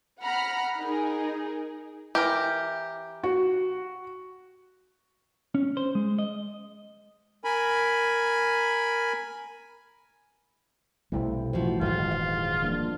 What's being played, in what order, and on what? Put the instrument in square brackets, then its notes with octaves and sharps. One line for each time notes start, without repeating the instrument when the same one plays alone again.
[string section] F#5 A#5 B5 F6
D#4 G#4 A#4
[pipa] E3 A#4 [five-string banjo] G4
[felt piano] F#4
[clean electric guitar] C#4
C5
G#3
D#5
[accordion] A#4 G#5 B5
[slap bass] B1 C3 G3 [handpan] A3 E4 C5
[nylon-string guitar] A2 F3 [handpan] E3 F#4 C5
[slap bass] D#1 D#3 F#3 [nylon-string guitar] G#2 G#3 [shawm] F4
[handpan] F5
[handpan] F3 G3 D4 [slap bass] A#3